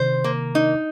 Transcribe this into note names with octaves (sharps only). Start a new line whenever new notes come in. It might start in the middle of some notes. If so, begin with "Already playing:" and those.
Already playing: C3 D#3 C5
A#3
D#4